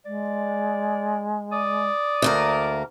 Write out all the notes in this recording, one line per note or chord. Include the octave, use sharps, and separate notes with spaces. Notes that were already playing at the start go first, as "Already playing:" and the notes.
G#3 D5
D5 D#6
D2 A#3 A#4 E5